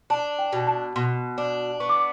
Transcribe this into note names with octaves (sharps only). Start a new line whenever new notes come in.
D4 A5
G5
B2
A5
B2 C6
D4
B3 C#6
D6